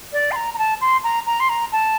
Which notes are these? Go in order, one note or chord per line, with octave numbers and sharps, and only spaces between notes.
D5
C6
A#5
A#5
A5
C6
A#5
A#5
C6
A#5
A5